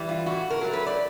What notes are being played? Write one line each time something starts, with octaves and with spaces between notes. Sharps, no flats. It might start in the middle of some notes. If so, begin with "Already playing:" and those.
Already playing: E3 G3
F4
A2 F#4
A#4
F#3 A3
B4
D5